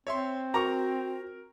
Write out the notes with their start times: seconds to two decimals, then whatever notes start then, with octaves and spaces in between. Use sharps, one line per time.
0.07 C4 C#5 E5 C6
0.54 F#4 A#4 A#5 C#6